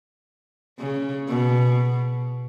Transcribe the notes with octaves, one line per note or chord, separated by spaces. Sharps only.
C#3
B2